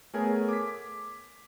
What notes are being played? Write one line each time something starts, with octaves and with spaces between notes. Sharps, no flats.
A3 B3 G#4 A#4 C#5 G#5
D6 G#6 B6